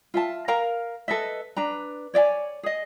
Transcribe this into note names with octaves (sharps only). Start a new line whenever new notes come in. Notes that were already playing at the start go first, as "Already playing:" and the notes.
F4 E5 A5
A#4 F5 A#5
A4 B4 D#5 E5
D4 B4 A#5
C#5 D5 E5 G#5
G#4 D#5